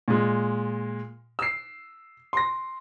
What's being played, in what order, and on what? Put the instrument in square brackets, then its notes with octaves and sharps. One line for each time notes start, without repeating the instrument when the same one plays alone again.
[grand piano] A#2 G#3
E6 C7
C6 A#6